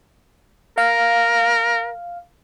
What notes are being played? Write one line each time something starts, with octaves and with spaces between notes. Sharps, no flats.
A#4 F5